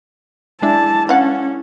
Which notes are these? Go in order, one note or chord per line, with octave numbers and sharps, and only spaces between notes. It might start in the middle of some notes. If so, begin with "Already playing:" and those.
G#3 D4 E4 A5
C#4 F5 F#5